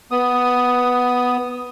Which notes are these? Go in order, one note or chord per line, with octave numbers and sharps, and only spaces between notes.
B3 D#6